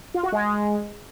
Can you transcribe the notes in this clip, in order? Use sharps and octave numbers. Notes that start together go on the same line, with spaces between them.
F4
F#4
G#3